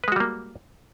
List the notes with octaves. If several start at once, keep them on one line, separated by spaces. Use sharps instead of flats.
G3 G#3 A#3 F#4 B4